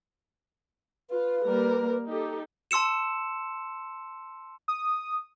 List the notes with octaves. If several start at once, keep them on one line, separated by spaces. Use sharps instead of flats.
F4 B4
G3 A#3 A#4
D#4 G4 A4
A5 C6 E6 C#7 E7
D#6